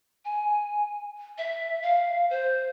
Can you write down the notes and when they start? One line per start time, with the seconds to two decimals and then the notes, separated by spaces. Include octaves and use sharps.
0.25 G#5
1.38 E5
1.83 F5
2.30 C5